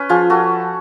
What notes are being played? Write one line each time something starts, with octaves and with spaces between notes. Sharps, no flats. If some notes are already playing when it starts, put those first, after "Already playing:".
Already playing: C#4 B4
F3 F4 G#4
F#4 A4